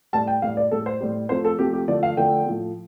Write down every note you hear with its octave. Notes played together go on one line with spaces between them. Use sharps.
A2 G3 A5
G5
A2 G3 F5
D5
A2 G3 A4
C5
A2 G3
C3 F3 A3 C5
A4
C3 F3 A3 G4
G4
D3 F3 A3 D5
F5
D3 F3 A3 G5
A2 F3 A3